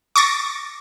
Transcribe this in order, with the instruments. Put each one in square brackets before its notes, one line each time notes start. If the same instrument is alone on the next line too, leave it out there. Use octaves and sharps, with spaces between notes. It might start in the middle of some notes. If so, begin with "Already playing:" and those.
[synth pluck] C#6 D6 A6 A#6